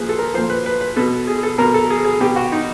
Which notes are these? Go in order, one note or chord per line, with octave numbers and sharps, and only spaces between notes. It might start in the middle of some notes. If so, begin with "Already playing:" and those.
Already playing: A#2 F3 G#4 B4
A4
A#4
A#2 F3 C5
B4
B4
B4
B2 A4
G#4
A4
B2 A#4
A4
G#4
G#4
B2 G4
F#4
D#4